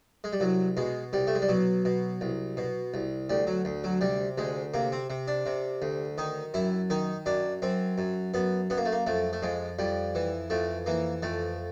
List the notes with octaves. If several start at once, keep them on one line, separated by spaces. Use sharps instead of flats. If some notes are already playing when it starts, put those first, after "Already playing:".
G#3
G3
C2 F#3
B2 G#3
C2 G3
A3
G#3
G3
B2 F#3
B2
C2
B2
C2
D2 G3
F#3
D2
F#3
C3 G3
D2 G#3
C3 A#3
C4
C3
D4
C3
D2
D#3 D#4
F#2 E4
D#3 D#4
F#2 D4
F#2 C4
F#2
F#2 B3
F#2 B3
A#3
A3
A#3
F2 A3
A3
F2 G#3
F2 G3
E3
F2 A3
E3 A#3
F2 A3